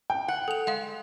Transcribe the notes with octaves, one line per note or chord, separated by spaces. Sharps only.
G5
F#5
A4 F7
G#3 F5 F#5